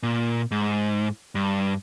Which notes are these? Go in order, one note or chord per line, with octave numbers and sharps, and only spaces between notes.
A#2
G#2
G2